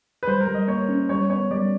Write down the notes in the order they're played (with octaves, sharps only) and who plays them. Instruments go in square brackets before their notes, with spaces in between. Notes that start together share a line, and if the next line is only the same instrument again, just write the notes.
[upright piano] B4
[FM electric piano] G3 [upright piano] C5
[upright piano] A#4
[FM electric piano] G3
[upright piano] D#5
[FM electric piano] A#3 [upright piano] C#5
[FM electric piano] C#4
[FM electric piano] G3 [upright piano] C#5
[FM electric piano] B3 [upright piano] C#5
[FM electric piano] G3 [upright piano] D5